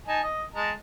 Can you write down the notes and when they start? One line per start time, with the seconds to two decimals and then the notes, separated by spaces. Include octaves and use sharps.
0.07 D#4 G#5 A5
0.23 D#5
0.54 G#3 A5 A#5